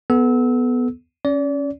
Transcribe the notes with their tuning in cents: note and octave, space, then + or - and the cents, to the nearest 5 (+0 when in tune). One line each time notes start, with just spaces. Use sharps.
B3 +0 A4 -30 E6 -25
C#4 +0 D5 -35